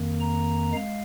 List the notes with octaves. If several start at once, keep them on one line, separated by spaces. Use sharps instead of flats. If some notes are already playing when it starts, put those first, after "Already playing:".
Already playing: F2 D#3 A#3
A#5
G#3 F5